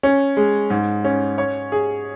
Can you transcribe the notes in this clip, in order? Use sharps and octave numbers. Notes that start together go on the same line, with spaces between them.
C#4
G#3
G#2
C#4
C#5
G#4